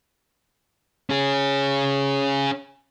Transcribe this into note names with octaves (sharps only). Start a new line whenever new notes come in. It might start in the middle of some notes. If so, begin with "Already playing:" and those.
C#4 G#4